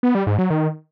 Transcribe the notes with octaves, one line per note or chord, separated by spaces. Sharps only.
B3
G3
G#2
F#3
D#3